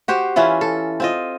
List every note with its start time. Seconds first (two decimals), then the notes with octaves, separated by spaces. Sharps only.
0.08 F#4 G4 C5
0.36 E3 C#4 E4 F4
0.61 A4
1.00 C4 F4 D#5